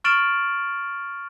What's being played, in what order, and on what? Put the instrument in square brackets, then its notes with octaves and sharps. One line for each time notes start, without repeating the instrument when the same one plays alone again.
[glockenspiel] C#6 F6 A6 D7 E7 F#7